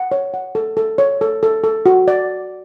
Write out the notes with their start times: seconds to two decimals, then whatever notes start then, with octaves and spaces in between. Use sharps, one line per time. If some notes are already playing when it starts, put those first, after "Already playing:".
Already playing: F#5
0.12 C#5
0.34 F#5
0.55 A4
0.77 A4
0.98 C#5
1.21 A4
1.43 A4
1.64 A4
1.86 F#4
2.08 D5